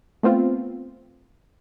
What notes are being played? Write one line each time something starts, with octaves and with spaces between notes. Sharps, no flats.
A3 B3 C4 F4